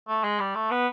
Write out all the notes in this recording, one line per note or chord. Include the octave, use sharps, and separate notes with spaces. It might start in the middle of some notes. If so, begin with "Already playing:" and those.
A3
G#3
G3
A3
B3